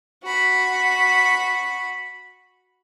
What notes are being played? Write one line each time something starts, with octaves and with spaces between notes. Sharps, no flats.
F#4 B5